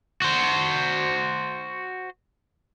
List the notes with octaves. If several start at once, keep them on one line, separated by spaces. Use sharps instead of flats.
F#4 C5